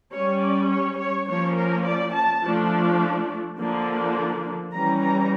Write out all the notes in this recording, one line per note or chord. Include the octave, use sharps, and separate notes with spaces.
G3 C#4 C#5
D5
C#5
C#5
F3 A#3 C#4 C#5
A#4
D5
A5
F3 A3 D4
D3 F3 A#3 D4
E3 G3 C#4 A#5
A#5